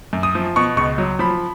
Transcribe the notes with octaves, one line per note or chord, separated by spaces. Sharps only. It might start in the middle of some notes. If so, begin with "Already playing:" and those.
F#2
D#6
F3
B2 C#6
C#2 C#6
F#3
F3 B5